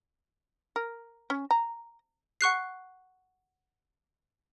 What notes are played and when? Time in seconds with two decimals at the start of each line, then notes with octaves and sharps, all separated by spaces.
0.76 A#4
1.30 C#4
1.51 A#5
2.41 F#5 C#6 F#6 C7